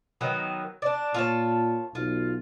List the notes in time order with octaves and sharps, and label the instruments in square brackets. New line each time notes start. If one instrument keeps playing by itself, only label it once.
[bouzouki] D#3 F#3 B3
D4 D5
[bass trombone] A#2 [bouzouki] F4 C#5 A5
[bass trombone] B1 [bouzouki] F4